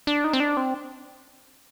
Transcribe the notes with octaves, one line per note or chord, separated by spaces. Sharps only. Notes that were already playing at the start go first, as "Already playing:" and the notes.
D4
D#4
C4
D4
C4